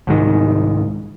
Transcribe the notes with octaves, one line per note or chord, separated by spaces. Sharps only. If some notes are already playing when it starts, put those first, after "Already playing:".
C2 G#2 D#3